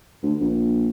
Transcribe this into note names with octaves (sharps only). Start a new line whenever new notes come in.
D2
A#1